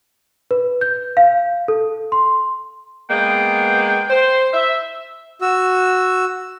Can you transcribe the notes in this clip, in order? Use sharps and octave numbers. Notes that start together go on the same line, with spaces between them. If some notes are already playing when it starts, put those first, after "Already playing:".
B4
G6
F5
A4
C6
G#3 A#3 B3 G5
C5
E5
F#4 E6